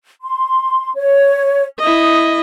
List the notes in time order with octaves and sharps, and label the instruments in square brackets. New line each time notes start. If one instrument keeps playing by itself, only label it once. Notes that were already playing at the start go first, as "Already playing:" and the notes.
[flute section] C6
C#5
[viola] E4 D#5 [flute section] D#6